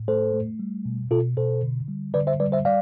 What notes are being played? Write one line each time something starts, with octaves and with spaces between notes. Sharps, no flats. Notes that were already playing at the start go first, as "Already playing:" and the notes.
Already playing: A2
A3 A4 C5
A3
G3
B2
B2 F4 A4
B2 A4 C5
D3
G3
D3 B4 D5
C5 E5
G3 B4 D5
C5 E5
G3 D5 F5